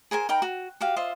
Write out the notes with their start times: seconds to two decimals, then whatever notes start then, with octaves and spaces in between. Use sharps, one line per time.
0.11 G#4 A#4 C5 G#5
0.29 D#4 A#4 G5 B5
0.42 F#4
0.81 F#4 G4 F5
0.96 F4 C5 D#5 E5